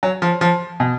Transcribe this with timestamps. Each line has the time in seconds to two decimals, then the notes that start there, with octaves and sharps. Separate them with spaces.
0.03 F#3
0.22 F3
0.41 F3
0.80 B2